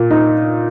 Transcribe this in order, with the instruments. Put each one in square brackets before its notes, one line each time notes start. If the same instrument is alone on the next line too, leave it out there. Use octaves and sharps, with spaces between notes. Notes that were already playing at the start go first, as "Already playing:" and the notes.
Already playing: [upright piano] A#2
D#4